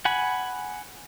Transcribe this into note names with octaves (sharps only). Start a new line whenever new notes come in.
F#5 G#5 B5